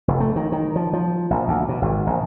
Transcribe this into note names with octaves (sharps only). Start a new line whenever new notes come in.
F1
A3
D#3
D#3
F3
F3
A#1
D2
B2
G#1
A#1